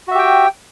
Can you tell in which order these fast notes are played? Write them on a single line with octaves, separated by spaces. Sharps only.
F#4 E5 G4 G5